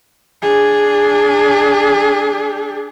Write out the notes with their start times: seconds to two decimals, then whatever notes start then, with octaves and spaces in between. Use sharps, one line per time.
0.42 D4 G#4